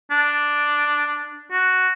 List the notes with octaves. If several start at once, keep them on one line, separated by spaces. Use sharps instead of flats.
D4
F#4